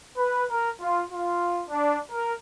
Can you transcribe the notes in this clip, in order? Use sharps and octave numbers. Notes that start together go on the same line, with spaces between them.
B4
A#4
F4
F4
D4
A#4